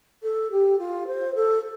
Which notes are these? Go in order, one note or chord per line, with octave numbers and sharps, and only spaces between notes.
A4
G4
F4
C5
A4